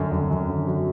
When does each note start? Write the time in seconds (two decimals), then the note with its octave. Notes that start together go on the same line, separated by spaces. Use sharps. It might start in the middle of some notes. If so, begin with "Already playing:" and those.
Already playing: F#2 D3
0.12 F#2
0.31 F#2
0.50 D3
0.67 F#3